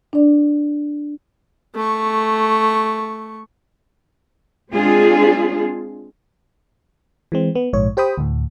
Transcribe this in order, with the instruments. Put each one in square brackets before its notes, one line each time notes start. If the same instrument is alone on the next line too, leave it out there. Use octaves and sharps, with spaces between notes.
[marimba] D4 D5
[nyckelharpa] A3 C#6
[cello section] G#3 C4 D4 F4 G#4
[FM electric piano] E3 G#3 C4
B3
A#1 G#2 C#5
G4 C5 G5 B5 D#6
D2 A2